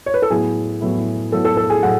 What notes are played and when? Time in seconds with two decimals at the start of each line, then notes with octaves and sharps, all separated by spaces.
0.06 C#5
0.14 B4
0.22 A4
0.30 A2 F#3 B3 E4 G#4
0.81 A2 F#3 B3 E4
1.32 A2 F#3 B3 E4 A4
1.45 A4
1.57 A4
1.70 G#4
1.83 A2 F#3 F#5